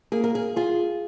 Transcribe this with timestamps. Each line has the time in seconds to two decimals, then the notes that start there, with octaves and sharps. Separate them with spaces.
0.12 A#3 G#4
0.24 A#4
0.35 G#4
0.56 F4 G#4